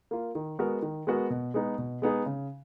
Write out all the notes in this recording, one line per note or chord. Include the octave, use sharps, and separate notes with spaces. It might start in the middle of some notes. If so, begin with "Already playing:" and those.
A#3 F4
D#3
G#3 B3 F#4 A#4
D#3
G#3 B3 F#4 A#4
B2
G#3 B3 D#4 G#4
B2
G#3 B3 D#4 G#4
C#3